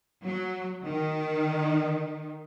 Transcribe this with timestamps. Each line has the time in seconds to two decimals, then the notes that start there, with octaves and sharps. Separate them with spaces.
0.25 F#3
0.85 D#3